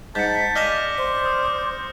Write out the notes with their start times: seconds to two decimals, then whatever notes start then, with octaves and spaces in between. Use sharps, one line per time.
0.15 G#2 A5 G6 B6 C#7
0.56 D5 D#5 F5 G#5 F6 A#6 E7
0.98 C5
1.24 D#6 F6